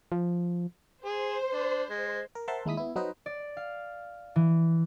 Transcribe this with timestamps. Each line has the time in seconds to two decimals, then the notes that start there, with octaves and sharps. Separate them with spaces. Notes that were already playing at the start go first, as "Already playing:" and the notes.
0.12 F3
1.05 G#4 C5
1.53 D4
1.90 G#3
2.35 A#4
2.48 A#4 C5 E5 F#5 A5 C6
2.65 D#2 G#3 E4 D#6 B6
2.77 B3 E4
2.96 F#3 D#4 B4 C5 D#5
3.26 D5
3.57 F5
4.36 E3